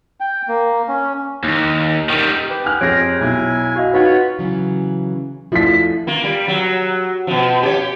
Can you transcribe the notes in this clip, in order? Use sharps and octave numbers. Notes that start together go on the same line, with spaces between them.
G5
A#3
C#4
D#2
D#3 G3
G4 B4
G#5 F6 F#6
F2 G4 G#4 C5 C#5 G#6 A#6 D7
B1 E4 G#5
F#4 D#5 F5
D#4 F4 F#4 B4 C#5 F#5 B5
C#3 E3 F#3
F3 A3 D4 E4 B6
A#3 F4
G3
F#3
B2 F3
G4 C#5